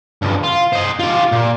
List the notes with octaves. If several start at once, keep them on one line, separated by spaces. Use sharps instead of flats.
C#2 G2
F4
C5 D#5
F4 G4
A#2